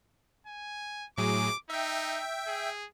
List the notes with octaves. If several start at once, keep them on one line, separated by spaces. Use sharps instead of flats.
G#5
A2 F#3 G#4 D6
D#4 E5 G5
G#4